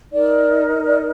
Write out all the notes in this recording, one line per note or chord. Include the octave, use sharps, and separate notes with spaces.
D#4 A#4 D5
D5